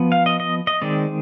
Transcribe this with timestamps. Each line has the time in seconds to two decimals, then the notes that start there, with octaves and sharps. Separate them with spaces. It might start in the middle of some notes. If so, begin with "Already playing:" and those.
Already playing: F3 B3
0.12 F5
0.26 D#5
0.40 D#5
0.67 D#5
0.81 D#3 G#3 C4 D5